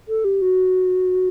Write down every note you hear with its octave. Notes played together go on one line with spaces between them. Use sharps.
A4
G4
F#4